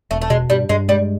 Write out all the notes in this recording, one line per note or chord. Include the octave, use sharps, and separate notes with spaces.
E1 A3
A3
B2 G#3
G2 G3
G2 G#3
G3 G#3